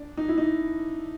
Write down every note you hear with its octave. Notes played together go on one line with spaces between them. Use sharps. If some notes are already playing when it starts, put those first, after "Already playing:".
Already playing: D4
D#4
E4
D#4